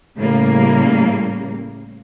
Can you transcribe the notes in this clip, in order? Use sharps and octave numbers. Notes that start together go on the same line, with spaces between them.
A2 C#3 G3 A#3